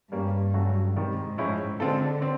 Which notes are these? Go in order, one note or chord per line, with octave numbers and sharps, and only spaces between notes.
G2 G3 A#3 C#4
C#3 F#3 A3 C#4 F#4
G#2 C3 D#3 G3
A2 F3 G#3 C#4 E4
D3 G#3 C4 F4 A4
C4